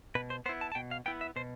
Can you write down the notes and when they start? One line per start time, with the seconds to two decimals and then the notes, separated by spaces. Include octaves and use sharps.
0.15 B2 B4
0.30 C5
0.46 B3 C5
0.49 E4
0.61 A5
0.72 A5
0.75 B2 G5
0.91 F5
1.06 B3 E4 G5
1.21 E5
1.36 B2 C5